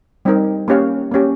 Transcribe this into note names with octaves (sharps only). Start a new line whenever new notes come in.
G3 C4 D#4 A#4
A#3 C#4 G4 C#5 F5
A#3 C#4 G4 C#5